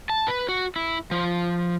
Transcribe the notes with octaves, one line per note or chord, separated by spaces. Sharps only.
A5
B4
F#4
E4
F3